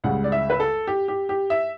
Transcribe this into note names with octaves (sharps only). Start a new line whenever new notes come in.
C#2 C#3 G3 F#5
D5
E5
B4
A4
G4
G4
G4
E5